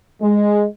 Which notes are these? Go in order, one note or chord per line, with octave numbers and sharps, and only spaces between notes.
G#3